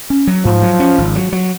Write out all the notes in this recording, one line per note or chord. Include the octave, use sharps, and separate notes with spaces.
C#4
F#3
G#2 F3
F#3
C#4
G#1
F#3
F#3